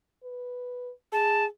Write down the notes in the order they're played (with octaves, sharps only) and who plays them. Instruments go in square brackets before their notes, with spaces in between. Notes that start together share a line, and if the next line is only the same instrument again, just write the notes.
[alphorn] B4
[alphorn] G#4 [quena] A5